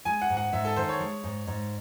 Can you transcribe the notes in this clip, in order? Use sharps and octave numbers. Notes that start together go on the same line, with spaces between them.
G#3 G#5
F#5
G#2
F#5
G#2 E5
A4
D#3 C5
C#5
G#3
G#2
G#2